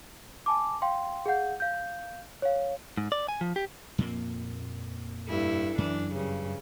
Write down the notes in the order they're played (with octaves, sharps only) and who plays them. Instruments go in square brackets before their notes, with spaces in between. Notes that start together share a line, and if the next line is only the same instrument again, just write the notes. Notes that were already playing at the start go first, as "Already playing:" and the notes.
[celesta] G#5 A5 D6
F5 G5 C6
G#4 F5 F#5 G6
F5 G6
C#5 F5
[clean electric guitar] G#2
D5
G#5
F3
G4
[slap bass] F2 A#2 A#3
[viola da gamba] G2 E4 A4
[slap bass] F#2 [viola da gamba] E3 D4
[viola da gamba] G2 C#3